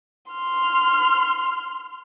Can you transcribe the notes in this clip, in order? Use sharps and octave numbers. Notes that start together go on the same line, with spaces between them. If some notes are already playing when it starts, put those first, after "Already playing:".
C6 F6